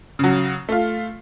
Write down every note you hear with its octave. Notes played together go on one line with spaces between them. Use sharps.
C#3 F#3
A3 F4